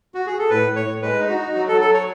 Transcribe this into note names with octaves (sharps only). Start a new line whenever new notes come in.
F#4
G#4
A4
A2 B4
A2
C#5
A2
G#3 B4
D#4
F#4
D#4
F#3 F#4
F#3 A4
A4
C#5